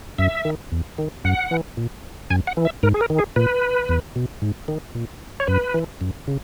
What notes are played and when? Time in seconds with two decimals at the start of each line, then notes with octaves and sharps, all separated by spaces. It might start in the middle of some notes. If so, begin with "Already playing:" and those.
0.18 F#2 E5
0.45 D#3
0.72 E2
0.98 D#3
1.24 F#2 F#5
1.51 E3
1.77 A#2
2.30 F#2 G#5
2.47 F#5
2.57 E3
2.65 E5
2.83 G#2 A#4
2.94 G#4
3.01 A#4
3.10 D#3
3.19 G#4
3.36 A#2 B4
3.89 E2
4.16 B2
4.42 G#2
4.68 D#3
4.95 A#2
5.40 C#5
5.47 F#2 B4
5.74 E3
6.01 F#2
6.27 C#3